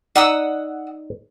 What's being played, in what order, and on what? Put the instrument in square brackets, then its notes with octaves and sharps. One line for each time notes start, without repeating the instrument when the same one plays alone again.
[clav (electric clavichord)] D#4 D5 [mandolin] F#5 D#6 E6